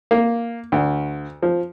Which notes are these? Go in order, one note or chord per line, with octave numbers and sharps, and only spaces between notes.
A#3
D2
F3